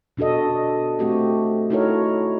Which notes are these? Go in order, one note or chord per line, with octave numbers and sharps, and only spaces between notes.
B2 D4 F#4 A4 D#5
A3 C4 F#4 G4
D#4 E4 F#4 A4 A#4 C#5